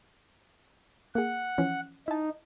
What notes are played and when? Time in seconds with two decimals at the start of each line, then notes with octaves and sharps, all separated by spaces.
1.15 A#3 G#4 F#5
1.58 E3 F3 C#4
2.08 D#4 E4 A5